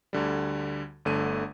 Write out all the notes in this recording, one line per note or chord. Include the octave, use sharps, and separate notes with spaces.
D2 D3 G3
G1 D3 A3 D#7